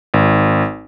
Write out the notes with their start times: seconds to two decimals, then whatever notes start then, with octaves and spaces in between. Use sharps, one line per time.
0.14 G#1